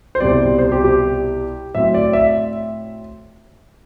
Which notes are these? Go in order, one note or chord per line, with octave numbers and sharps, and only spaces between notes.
C5
C2 B2 G3 C4 D5
C5
G4
G4
A2 F#3 C4 E5
D5
E5